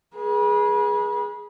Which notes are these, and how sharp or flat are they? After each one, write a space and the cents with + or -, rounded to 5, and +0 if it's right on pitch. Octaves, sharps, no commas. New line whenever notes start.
G#4 +0 B4 -35